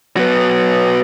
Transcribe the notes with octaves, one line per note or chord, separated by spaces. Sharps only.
F#3 B3